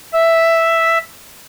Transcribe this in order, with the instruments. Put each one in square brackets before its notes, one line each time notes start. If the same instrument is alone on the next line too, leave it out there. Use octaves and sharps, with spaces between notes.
[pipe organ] E5